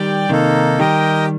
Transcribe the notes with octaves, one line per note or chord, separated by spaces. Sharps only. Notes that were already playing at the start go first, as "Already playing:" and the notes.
Already playing: D#3 G3 G4 D5 G5
C3 D#3 A#3 D#4 A4
D#3 G3 G4 A#4 D#5 G5